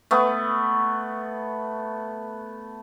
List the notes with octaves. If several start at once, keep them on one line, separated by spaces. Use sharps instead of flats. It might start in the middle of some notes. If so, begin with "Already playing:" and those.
A3 B3